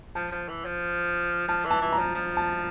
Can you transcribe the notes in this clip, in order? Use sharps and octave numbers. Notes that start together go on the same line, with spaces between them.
F3 A5
F3
E3
F3
F3 A5
E3
A5
E3
A#5
F3
F3
A5